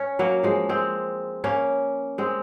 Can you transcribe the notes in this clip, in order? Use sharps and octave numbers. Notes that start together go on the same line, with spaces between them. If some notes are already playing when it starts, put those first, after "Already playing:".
Already playing: C#4
F#3 A#3
F3 G#3
G#3 C4
A#3 C#4
G#3 C4